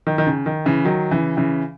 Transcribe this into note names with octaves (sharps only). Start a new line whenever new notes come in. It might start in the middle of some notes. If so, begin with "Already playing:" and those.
D#3
D#3
C#3
D#3
C#3 E3
D#3 F#3
C#3 E3
C#3 E3